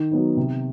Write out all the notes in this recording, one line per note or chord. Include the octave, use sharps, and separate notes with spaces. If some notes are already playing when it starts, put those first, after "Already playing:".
Already playing: D#3
F#3 B3 D#4
C3